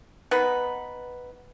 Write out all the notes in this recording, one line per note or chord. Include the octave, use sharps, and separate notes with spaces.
B3 D#4 B4